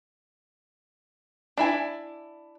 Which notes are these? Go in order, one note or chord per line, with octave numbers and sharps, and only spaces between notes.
D4 E4 G#5